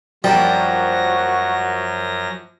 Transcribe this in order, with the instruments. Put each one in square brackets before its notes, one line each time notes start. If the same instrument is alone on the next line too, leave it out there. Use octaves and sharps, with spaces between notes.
[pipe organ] F#2 A#6 [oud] F3 A#3 D4 [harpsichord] G3 [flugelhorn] F#4